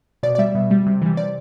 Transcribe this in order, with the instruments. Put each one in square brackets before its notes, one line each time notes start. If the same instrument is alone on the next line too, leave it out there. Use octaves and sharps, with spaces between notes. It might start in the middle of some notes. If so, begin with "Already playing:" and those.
[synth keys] B2 D5
D5
G3 E5
B2
G3
C3
E3 G3
C3 D5